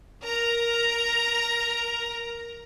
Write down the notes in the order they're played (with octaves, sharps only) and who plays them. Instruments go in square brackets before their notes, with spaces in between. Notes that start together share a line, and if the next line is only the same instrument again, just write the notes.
[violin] A#4 A#5